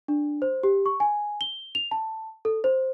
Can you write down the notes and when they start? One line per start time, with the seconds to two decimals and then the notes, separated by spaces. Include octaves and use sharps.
0.08 D4
0.42 C5
0.63 G4
0.86 C#6
1.00 G#5
1.41 G7
1.75 F7
1.91 A5
2.45 A4
2.64 C5